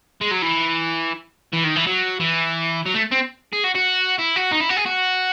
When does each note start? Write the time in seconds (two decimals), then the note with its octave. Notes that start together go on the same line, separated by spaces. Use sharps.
0.21 G#3
0.31 F#3
0.42 E3
1.53 E3
1.65 D#3
1.76 E3
1.87 F#3
2.20 E3
2.86 F#3
2.94 A3
3.12 C4
3.53 G#4
3.64 F#4
3.75 F#4
4.19 E4
4.36 F#4
4.52 D#4
4.61 E4
4.69 F#4
4.77 G#4
4.86 F#4